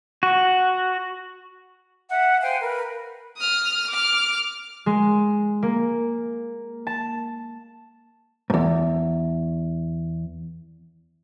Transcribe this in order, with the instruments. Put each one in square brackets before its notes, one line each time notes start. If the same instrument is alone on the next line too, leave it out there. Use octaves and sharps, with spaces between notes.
[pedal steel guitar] F#4
[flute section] E5 F#5
C5 F5 G5 G#5
A#4 B4
[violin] D#6 F6
D6 F6
[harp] G#3
A#3
A5
[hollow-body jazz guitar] E2 G#2